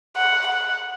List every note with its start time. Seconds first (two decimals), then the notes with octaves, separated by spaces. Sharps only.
0.17 F#5
0.47 F#5